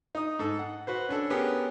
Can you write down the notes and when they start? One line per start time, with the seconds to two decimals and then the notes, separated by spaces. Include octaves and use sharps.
0.15 D#4 D#6
0.39 G#2 A4
0.59 F#5
0.87 F#4 B4 C5
1.09 C#4 D4 A4
1.30 B3 C#4 G4 G#4 A#4